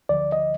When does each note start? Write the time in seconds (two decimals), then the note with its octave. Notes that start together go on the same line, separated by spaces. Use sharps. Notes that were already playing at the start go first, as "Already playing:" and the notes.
0.09 D2 D3 F3 D5
0.32 D#5